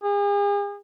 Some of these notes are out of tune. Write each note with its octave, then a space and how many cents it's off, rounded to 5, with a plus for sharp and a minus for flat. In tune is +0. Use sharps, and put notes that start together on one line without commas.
G#4 -40